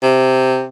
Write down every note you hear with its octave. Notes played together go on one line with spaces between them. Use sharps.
C3